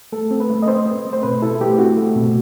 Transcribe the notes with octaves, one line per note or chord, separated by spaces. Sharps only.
A3 A4
C4
B4
A3
D#5
C4 C5
C4
A3
C5
B2 B4
E4 A4
A3 G4
C4 F#4
A3
B2